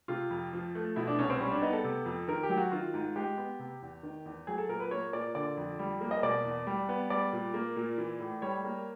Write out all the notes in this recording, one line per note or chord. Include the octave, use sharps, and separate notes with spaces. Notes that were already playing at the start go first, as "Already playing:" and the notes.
C3 F4
F2
F3
A3
B2 E4
D4
C2 C#4
C4
G3 C#4
D4
B3 D#4
A4
C3
F2
D#3 A#4
G4
F#3
F#4
D#3 F4
G#2
G#3 G4
B3
C3
E2
D#3
E2
F#3 G#4
A4
A#2 A#4
B4
A#3 C#5
A#2 D5
D3 D5
F2
G3
A#3
D#5
B2 D5
E2
G3
B3
G3 D5
A#2
A#3
A#2
E3
A2
G3 C#5
A#3